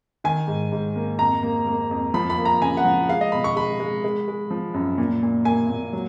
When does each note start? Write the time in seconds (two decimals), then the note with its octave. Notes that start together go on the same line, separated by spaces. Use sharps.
0.24 D#3 G#5
0.47 G#2
0.72 G#2
0.96 A#3
1.19 F2 A#5
1.43 A#3
1.67 A#3
1.91 F2
2.14 F3 B5
2.30 B5
2.37 A#3
2.45 A#5
2.61 C#3 G#5
2.77 F#5
2.85 F3
3.09 G#3 F5
3.21 D#5
3.32 B2 B5
3.44 C#6
3.56 G#3 B5
3.80 G#3
4.04 G#3
4.28 G#3
4.51 F3
4.74 F#2
4.98 A#2
5.23 A#2
5.45 A#3 G#5
5.70 A#2
5.93 F#3